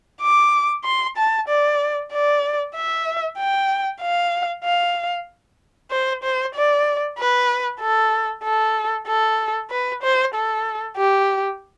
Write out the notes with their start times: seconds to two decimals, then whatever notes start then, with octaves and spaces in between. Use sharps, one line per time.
0.22 D6
0.85 C6
1.17 A5
1.49 D5
2.12 D5
2.75 E5
3.39 G5
4.01 F5
4.64 F5
5.91 C5
6.24 C5
6.55 D5
7.18 B4
7.81 A4
8.44 A4
9.07 A4
9.71 B4
10.03 C5
10.35 A4
10.97 G4